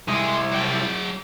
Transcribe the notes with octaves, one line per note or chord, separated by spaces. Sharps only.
C2 G#3 E4 D#5
F#3 G5